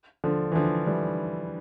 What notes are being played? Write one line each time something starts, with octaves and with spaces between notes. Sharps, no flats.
D3 F3
E3
D3 F3
E3 G3